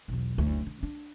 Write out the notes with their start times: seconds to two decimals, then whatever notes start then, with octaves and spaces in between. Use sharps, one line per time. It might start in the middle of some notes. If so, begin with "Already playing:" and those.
0.08 B1 E2
0.38 F#1 D2
0.67 D3
0.83 D4